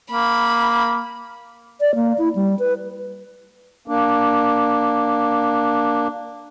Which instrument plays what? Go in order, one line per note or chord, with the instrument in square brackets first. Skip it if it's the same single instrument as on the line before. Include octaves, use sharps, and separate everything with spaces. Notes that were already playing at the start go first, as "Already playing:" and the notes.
[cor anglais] A#3 [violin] B5
[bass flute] D5
A#3
E4
G3
B4
[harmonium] A#3 D4